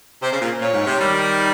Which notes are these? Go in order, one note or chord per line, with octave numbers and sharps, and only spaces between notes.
C3 C5
C#3
A#2
A#2 C#5
G#2
C3
D#3 G3